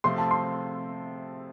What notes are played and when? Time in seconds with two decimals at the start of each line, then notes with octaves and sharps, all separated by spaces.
0.04 C3 F3 A3 C4 C6
0.18 A5
0.31 C6